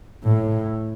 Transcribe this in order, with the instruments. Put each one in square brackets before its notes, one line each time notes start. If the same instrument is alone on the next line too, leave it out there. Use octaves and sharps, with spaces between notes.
[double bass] A2